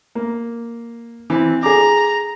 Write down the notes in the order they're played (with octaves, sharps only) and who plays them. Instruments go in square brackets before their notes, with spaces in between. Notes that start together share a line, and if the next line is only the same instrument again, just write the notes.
[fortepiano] A#3
E3 C4
[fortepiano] G#4 D6 [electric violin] A#5